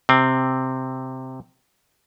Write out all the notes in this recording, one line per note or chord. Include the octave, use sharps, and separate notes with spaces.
C3 C4